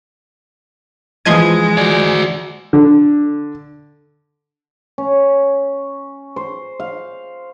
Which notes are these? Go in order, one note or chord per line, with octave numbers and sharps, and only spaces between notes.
E3 F3 G#3 D#5 C6 G#6 D#7
F#4 D5
D3
C#4
C5
F5